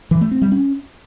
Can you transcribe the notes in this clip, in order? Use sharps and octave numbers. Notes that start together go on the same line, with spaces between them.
E3
A3
C4
G3
C#4